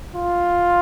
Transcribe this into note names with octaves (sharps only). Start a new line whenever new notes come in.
F4